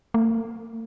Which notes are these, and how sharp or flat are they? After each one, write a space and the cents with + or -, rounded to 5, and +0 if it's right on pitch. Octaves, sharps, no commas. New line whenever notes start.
A#3 -45